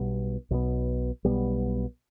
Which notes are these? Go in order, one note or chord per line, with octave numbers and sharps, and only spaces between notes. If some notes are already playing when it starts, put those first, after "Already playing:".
Already playing: B1 B2 G3 B3
B1 B2 G3 B3
B1 B2 G3 B3